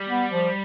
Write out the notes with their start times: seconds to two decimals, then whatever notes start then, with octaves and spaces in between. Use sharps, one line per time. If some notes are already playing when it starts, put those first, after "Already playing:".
Already playing: G3
0.09 B3
0.32 F3